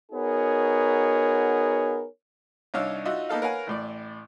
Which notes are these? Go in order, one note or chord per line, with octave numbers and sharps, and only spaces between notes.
B3 D#4 F#4 G#4 A#4 C#5
C2 D4 D#4 C#5 F5 E6
D#4 F4 F#4 E5
A#3 B3 D#4 A4 F5
A#4 B4 C#5 F5 F#5 G#5
A1 A2 D5